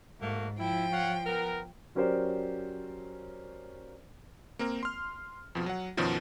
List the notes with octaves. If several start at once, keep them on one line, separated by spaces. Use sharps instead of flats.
G#2 A3 A#3 F#4
F3 E4 G5
C#5 F5 F#5
B3 A#4
F#3 C#4 G4 A#4 C5 D5
A#3 C4 A#4
C6 F6
F2 B2 F3
F#3 F#5
F#2 B2 D#3 F3 F#3